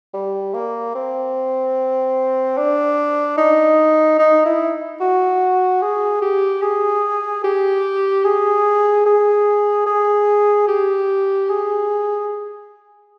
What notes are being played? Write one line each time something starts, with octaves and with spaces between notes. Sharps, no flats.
G3
A#3
C4
D4
D#4
D#4
E4
F#4
G#4
G4
G#4
G4
G#4
G#4
G#4
G4
G#4